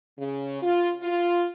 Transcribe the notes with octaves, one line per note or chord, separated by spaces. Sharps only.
C#3
F4
F4